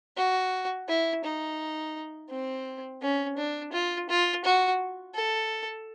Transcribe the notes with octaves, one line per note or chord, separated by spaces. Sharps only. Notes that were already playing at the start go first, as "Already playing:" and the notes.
F#4
E4
D#4
C4
C#4
D4
F4
F4
F#4
A4